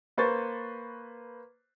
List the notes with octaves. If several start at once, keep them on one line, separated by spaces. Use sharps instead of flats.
A#3 B4 C5 C#6 A6